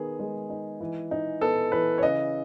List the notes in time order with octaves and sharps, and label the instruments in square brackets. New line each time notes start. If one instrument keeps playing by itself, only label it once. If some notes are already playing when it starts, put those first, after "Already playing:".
Already playing: [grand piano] D#3 B3 G#4
G#3
D#4
E3
D#4
B3 A4
E3 B4
C#5
C#3 D#5